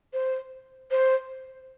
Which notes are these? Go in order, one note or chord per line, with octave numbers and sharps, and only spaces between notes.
C5
C5